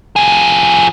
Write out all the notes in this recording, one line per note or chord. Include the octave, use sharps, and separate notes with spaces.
F3 G#4